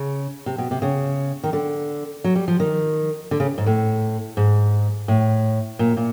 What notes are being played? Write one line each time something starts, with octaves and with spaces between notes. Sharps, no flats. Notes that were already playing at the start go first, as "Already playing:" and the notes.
Already playing: C#3
C3
B2
C3
C#3
D#3
D3
F#3
G3
F3
D#3
D3
C#3
G#2
A2
G#2
A2
A#2
A#2